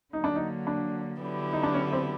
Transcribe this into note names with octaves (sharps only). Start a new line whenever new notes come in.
D3 F#3 A#3 D#4
D4
D#4
D4
D3 F#3 B3 E4 G4
D#4
D4
C#4
C4